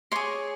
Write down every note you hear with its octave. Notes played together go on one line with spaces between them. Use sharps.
G#4 C#5 C6 D6